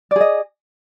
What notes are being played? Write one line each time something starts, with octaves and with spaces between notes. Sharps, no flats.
G#4 D5 D#5